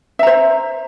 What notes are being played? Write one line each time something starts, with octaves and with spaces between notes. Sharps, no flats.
C5 E5 A#5